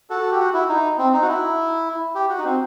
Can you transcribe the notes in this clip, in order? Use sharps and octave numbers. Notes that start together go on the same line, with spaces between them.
F#4 A4
G4
F#4
E4
D#4
C4
D#4
F#4
E4
G4
F#4
D#4
C4